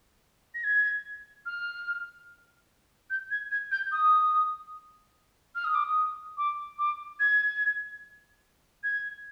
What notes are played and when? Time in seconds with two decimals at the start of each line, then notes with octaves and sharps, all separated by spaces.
0.55 A#6
0.64 G#6
1.46 F6
3.10 G6
3.31 G#6
3.51 G#6
3.72 G6
3.92 D#6
5.55 F6
5.64 D#6
5.75 D6
5.84 D#6
6.37 D6
6.79 D6
7.20 G#6
8.83 G#6